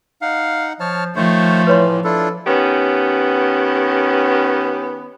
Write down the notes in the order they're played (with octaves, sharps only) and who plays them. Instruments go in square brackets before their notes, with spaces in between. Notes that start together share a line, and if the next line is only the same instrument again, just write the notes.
[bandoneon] D#4 F#5 [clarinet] F5
[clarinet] F3 [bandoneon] C#5 A5 F6
[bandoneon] D#3 C5 C#5 [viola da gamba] F3 [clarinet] A3
[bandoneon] A2 E3 [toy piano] B4 C#5 C6
[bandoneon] D4 E4 F4 [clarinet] A4
[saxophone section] D#3 B3 C#4 G4